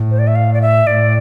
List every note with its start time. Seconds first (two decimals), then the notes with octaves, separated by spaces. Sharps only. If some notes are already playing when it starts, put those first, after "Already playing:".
Already playing: A2
0.11 C5
0.19 D5
0.27 E5
0.35 F5
0.54 D5
0.62 E5
0.87 A2 D5